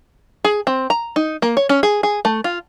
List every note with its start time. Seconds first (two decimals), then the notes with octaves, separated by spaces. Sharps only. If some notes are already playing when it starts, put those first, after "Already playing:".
0.44 G#4
0.67 C4
0.90 A#5
1.16 D#4
1.42 A#3
1.57 C#5
1.69 C#4
1.83 G#4
2.03 G#4
2.25 A3
2.44 F4